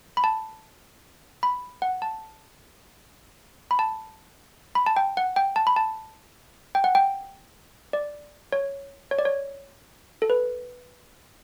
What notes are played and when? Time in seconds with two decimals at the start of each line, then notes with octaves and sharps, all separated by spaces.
0.17 B5
0.24 A5
1.43 B5
1.82 F#5
2.02 A5
3.71 B5
3.79 A5
4.75 B5
4.86 A5
4.96 G5
5.17 F#5
5.36 G5
5.56 A5
5.67 B5
5.76 A5
6.75 G5
6.84 F#5
6.95 G5
7.93 D5
8.52 C#5
9.11 C#5
9.19 D5
9.25 C#5
10.22 A4
10.30 B4